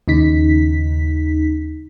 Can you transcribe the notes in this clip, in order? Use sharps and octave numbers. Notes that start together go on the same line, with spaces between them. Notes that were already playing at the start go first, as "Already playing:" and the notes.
D#2 C#3 D#4 B6